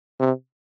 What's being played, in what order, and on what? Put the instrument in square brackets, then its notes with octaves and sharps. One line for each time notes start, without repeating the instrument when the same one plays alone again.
[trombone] C3